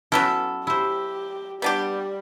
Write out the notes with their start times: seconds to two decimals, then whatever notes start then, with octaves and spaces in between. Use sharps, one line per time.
0.12 F#3 B3 C#4 E4 A4 G5
0.67 E4 G4 C5
1.62 G3 B3 D4 G4